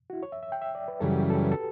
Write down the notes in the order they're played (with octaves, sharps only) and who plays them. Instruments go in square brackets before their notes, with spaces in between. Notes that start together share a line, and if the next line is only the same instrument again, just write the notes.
[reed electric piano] F#4
E4
C#5
E5
E5
G5
E5
D5
B4
[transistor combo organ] F#2 C#3 E3 G3 [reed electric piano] A4
[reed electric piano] F#4
G4
A4
B4
A4